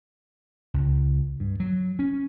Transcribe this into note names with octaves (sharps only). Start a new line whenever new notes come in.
C#2
G2
F#3
C#4